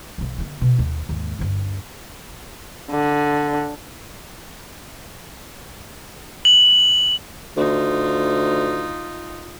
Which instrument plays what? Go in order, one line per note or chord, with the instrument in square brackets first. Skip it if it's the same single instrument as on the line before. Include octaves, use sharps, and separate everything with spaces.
[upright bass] B1 E3
D3 B3
B2
D#2
D#2 G#2
G1 D2
[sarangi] D3
[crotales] F#7
[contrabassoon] D2 [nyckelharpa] D#4 F4